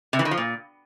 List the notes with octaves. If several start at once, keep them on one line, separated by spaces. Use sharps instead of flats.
C3
E3
D#3
F3
A#2